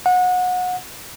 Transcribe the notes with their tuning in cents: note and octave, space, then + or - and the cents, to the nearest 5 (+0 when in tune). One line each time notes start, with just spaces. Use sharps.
F#5 -25